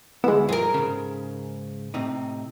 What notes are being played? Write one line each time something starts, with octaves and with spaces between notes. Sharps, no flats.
D2 G#3 B3 E4
G2 F3 G#4 A#4
G#2 C#3
A2 C3 D#4